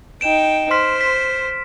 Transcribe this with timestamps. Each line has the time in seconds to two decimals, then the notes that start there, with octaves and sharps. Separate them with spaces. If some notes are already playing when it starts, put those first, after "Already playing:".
0.21 D#4 G5 D7 E7
0.71 C5 C6 F6 B6
1.01 B6